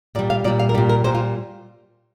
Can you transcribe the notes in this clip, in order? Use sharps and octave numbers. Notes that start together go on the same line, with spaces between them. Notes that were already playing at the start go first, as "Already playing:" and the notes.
A#2 G3 D5
F5
A#2 G3 D5
F5
A#4
A#2 G3 G4
A#4
A#2 G3 C5
F4